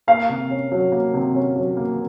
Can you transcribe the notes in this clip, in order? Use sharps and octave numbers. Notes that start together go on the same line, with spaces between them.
A#3 F5
C3
C#4
F#3
A#3
C3
C#4
F#3
A#3